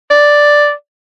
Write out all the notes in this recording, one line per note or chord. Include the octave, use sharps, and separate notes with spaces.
D5